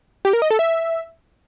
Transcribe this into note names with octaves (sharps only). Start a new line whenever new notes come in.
G4
A#4
D#5
A4
E5